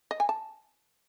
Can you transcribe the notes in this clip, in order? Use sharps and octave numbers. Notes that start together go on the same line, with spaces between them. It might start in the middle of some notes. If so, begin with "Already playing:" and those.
D#5
G#5
A5